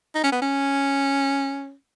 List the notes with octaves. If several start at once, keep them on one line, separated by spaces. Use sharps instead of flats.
D#4
C#4
B3
C#4